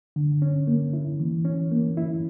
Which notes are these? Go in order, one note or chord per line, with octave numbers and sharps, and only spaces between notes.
D3
C#4
A#3
E4
E3
C#4
A#3
E4